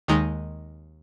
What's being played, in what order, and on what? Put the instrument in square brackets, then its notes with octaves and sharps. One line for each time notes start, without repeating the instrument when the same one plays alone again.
[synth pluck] D#2 D#3 G#3 D#4